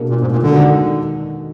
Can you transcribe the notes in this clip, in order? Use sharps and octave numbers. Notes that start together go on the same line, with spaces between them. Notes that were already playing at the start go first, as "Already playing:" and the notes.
Already playing: B2 A#3 D4 G#4
A#2
G#2
A#2
D3 D#3 G#3 D#4 F#4 A#4